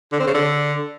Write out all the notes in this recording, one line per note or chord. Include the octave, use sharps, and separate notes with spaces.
D3
C4
C#3
D3